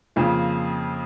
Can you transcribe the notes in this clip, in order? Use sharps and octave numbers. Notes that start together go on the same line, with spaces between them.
F2 C#3 F3 A#3